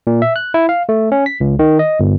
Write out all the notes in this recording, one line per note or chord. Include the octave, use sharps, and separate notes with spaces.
A#2
E5
F#6
E4
F5
A3
C#4
B6
C#2
D#3
D#5
G1